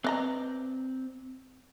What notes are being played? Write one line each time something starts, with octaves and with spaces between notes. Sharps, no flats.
C4 B4 D5 D#5 A#5